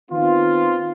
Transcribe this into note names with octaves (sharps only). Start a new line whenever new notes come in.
D#3 B3 C4 F4